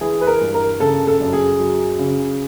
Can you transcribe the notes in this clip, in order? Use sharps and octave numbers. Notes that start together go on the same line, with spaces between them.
E3 G#4
B4
A#4
G2
A#4
C#3 A4
A4
F#2
G#4
F#3
C#3